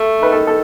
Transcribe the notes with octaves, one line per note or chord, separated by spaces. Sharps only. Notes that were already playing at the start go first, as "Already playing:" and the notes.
Already playing: A3
D#3 B4
A4
A4